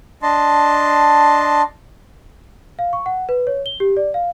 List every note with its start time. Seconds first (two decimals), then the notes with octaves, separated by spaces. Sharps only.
0.22 D4 D#5 A5 C6
2.79 F5
2.93 C#6
3.06 F#5
3.29 B4
3.47 C#5
3.66 G7
3.80 G4
3.97 D5
4.14 F5